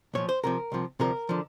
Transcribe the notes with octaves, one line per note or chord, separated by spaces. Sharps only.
B1 A#2 F3 C#5
C5
C#2 C3 F3 A#4
C2 C3 F3
D2 C3 F3 A#4
D3 F3